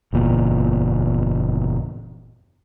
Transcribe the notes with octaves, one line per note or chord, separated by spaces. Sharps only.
F#1 E2 A#2